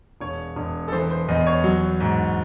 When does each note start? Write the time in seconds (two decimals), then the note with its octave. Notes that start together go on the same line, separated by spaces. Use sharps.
0.21 E1 C#5
0.56 E1
0.88 A4
0.92 E3 C5
1.10 C5
1.28 E2 D#5
1.47 C#5
1.64 F#3
2.00 G#2